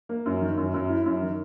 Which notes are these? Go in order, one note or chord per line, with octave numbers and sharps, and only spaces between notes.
A#3
F#2
D#3
F#2
F#2
E4
F#2
D#3